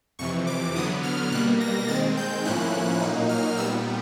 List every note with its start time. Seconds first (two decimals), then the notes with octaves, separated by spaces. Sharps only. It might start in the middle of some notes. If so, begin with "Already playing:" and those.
0.19 F2 C3 E3 C#6
0.47 D6
0.75 D3 F#3 B3 D#6
1.03 F6
1.32 B2 G3 A#3 F#6
1.60 A#6
1.88 D#3 G#3 C4 A6
2.17 G6
2.45 A2 F3 A#3 C#4 E4 F#6
3.01 A#2 F#3 A#3 D#4
3.29 F6
3.57 A#2 G3 B3 E6